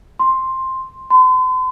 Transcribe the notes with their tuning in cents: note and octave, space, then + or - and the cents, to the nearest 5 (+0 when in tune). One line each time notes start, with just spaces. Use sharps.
C6 +5
C6 -45